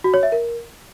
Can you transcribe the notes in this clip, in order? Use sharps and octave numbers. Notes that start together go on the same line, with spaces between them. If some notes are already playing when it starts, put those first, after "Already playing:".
F#4
C#5
E5
A#4